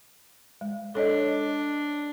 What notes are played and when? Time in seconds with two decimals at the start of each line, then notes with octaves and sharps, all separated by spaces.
0.61 G#3
0.95 D4 A4 C#5 D#5